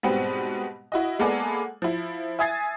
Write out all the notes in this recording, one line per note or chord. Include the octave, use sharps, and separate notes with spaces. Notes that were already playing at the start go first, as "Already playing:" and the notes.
G#2 B2 G3 B3 C4
E4 F#4 D#5
G#3 A#3 B3 A4 D5 G#5
F3 E4
E5 G#5 D#6 G#6 A6 C7